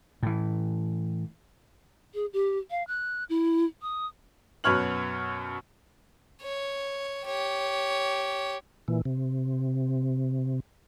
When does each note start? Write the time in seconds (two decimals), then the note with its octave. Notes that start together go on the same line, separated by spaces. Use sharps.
0.23 A2 E3
2.14 G#4
2.33 G4
2.71 F5
2.87 F#6
3.29 E4
3.82 D#6
4.64 F#2 B2 B4 C#5 F6 F#7
6.42 C#5
7.26 G4 C#5
8.88 A#2 E3
9.05 C3